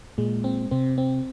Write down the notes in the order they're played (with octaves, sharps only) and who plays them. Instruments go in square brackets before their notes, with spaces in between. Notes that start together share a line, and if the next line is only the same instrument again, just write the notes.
[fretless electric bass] A#2 [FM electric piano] G#3
[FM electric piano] C4
[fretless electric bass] C3 [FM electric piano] C4
[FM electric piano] C4